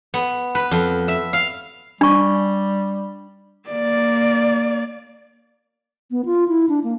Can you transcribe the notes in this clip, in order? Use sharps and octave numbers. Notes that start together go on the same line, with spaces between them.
B3
B4
F2
E5
F5
G3 D4 C#6
A#3 D5
B3
F4
E4
D4
A#3